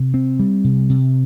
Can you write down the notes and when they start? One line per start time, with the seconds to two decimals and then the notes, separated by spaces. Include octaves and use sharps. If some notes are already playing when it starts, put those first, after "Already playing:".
Already playing: C3
0.14 C4
0.39 G3
0.64 C3
0.89 C3